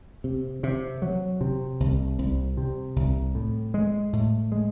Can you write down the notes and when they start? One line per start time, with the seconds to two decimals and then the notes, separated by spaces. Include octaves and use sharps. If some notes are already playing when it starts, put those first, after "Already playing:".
0.24 C3
0.63 C3
1.02 F#3
1.41 C3
1.80 C2
2.19 C2
2.57 C3
2.96 C2
3.35 A2
3.74 G#3
4.13 A2
4.52 G#3